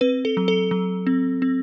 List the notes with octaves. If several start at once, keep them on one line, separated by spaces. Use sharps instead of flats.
C4 B4
A4
F#3
A4
F#3
C4
C4